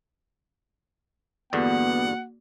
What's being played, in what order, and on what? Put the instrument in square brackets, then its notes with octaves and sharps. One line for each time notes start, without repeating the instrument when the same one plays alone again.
[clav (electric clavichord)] E2 G2 D3 [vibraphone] A#3 F#4 [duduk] B3 [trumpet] F#5